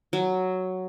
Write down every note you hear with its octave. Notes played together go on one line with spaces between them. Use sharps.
F#3